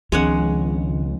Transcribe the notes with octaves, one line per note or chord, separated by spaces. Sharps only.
C#2 D#3 F3 G#3 C4 D4 C#5 F#5